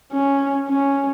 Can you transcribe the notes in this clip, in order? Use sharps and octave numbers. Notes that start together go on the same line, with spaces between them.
C#4
C#4